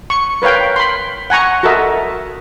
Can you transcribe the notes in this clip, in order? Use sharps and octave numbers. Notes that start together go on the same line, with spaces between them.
C#6
A#4 B4 C#5 F5 G5
B5 C6
F#5 G#5 A#5 C#6
F#4 A4 A#4 D#5 E5